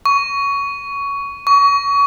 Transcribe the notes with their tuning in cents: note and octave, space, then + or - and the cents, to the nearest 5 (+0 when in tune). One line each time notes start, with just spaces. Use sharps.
C#6 +15
C#6 +30